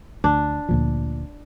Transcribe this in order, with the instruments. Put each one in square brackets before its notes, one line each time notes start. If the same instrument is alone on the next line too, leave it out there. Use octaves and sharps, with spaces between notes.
[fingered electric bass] D2 [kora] D4
[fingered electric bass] D2 A#2 F3